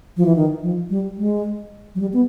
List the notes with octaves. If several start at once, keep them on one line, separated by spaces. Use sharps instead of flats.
F3
E3
D#3
F3
G3
G#3
F#3
G3
B3